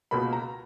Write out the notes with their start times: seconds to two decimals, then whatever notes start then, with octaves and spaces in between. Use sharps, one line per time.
0.11 C#2 B2 A#3 B5
0.33 A#5